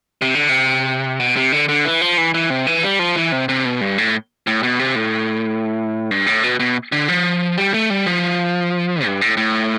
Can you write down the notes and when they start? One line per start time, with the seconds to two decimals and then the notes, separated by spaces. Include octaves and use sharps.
0.22 C3
0.35 D3
0.49 C3
1.20 B2
1.36 C3
1.52 D3
1.69 D3
1.85 E3
2.02 F3
2.17 E3
2.34 E3
2.50 C3
2.67 E3
2.83 G3
2.99 F3
3.16 E3
3.32 C3
3.49 C3
3.65 B2
3.81 G2
3.98 A2
4.47 A2
4.63 B2
4.79 C3
4.96 A2
6.11 G2
6.26 A2
6.43 B2
6.60 B2
6.92 D3
7.08 F3
7.58 G3
7.74 A3
7.90 G3
8.06 F3
9.05 G2
9.21 A2
9.37 A2